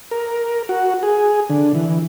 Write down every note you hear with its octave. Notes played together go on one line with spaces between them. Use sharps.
A#4
F#4
G#4
D3
E3